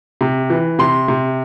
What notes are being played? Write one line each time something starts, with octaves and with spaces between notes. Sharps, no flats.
C3
E3
C3 C6
C3